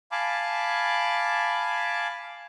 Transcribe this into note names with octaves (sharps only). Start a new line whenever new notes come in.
F5 G#5 A5 B5 D6